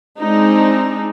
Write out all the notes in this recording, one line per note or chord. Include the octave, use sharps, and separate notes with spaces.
G#3 C4 D4 D#4